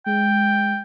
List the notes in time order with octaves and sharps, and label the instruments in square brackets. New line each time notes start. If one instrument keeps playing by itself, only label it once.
[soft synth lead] G#3 [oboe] G5